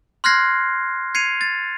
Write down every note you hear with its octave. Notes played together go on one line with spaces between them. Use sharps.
C6 F6 F#6 G#6 A#6 C7
G#6 C7 C#7 D#7 F7
A6